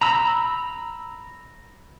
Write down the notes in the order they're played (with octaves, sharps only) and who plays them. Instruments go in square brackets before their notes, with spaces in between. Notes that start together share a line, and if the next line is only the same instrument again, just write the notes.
[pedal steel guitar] A#5 B5 E6